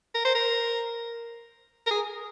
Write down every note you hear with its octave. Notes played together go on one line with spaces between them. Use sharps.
A#4
C5
A#4
A#4
G#4